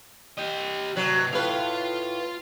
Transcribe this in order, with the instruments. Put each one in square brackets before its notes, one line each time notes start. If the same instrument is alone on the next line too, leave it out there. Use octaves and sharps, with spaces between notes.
[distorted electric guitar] G4 D#5
[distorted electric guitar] C3 B4 [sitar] F#3
[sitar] A2 B4 [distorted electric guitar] F4 F5